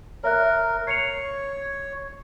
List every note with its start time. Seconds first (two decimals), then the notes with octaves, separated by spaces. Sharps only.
0.24 A#4 C#5 E5 F#6
0.87 C#5 C7 C#7 F7